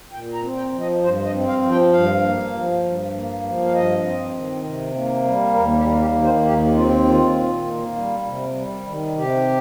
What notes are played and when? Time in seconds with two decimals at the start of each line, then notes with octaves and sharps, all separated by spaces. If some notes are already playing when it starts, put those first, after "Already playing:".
0.12 A#2 G5
0.34 A#5
0.42 C4
0.56 G5
0.72 F3
0.80 D#5
1.02 G2 C5
1.25 D#5
1.33 C4
1.47 F5
1.62 F3
1.71 G5
1.93 G2 F5
2.22 A#3
2.53 F3
2.83 G2
3.14 A#3
3.43 F3
3.64 F5
3.73 G2 D#5
4.03 C4
4.33 D#3
4.64 C3
4.94 A#3
5.24 G3
5.54 D#2 A#4
5.77 G4
5.84 A#3
6.00 G4
6.15 D#3
6.23 C5
6.45 D#2 G4
6.75 C4 F4
7.05 D#3 F4
7.35 A#2
7.66 A#3
7.96 G3
8.26 C3
8.56 G3
8.86 D#3
9.16 C3 G4